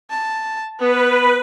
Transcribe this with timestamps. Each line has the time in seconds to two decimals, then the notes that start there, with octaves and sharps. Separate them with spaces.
0.10 A5
0.79 B3 B4